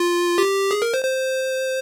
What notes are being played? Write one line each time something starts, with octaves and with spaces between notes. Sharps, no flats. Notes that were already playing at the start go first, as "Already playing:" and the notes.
Already playing: F4
G4
G#4
A#4
C5
C5